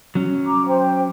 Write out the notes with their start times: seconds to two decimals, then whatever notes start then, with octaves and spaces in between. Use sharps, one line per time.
0.15 F#3 C#4
0.45 A#5 D6
0.67 C5 G5